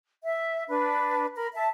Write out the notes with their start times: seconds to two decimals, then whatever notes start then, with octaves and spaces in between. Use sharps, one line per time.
0.23 E5
0.68 D4 B4
1.35 A#4 B5
1.55 E5 A5